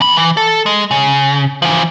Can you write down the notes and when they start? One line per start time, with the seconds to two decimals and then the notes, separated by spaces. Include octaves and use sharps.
0.01 E2 B5
0.17 E3
0.37 A4
0.66 G#3
0.91 C#3
1.62 E3 F3